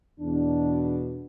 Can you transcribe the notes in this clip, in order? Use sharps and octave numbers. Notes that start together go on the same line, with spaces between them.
E2 B2 D4